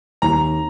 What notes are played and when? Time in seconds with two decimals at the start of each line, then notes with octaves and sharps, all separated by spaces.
0.22 D#2 A#5